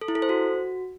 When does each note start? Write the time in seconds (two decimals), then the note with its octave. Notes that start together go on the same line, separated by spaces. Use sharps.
0.01 A4
0.08 E4
0.15 A4
0.22 C5
0.29 F#4